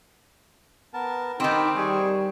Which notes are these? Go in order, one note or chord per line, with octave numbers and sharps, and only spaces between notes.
B3 A#4 A5
D#3 C4 D#4 G4 B5
G3 G#4 G#5 C#6